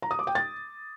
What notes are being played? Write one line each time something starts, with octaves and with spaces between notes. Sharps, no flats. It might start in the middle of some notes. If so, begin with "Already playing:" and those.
A#5
D#6
D6
G5
A6